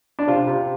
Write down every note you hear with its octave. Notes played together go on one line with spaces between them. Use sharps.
D4
C3 F4
C3